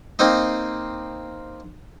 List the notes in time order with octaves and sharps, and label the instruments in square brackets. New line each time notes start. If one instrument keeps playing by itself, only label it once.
[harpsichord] A#3 C4 D#4 D#5